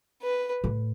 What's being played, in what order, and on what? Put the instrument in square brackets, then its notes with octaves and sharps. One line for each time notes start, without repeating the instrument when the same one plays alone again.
[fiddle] B4
[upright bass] A2